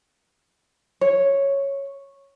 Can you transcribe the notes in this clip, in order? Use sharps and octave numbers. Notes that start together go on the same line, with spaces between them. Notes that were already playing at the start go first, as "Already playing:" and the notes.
C#5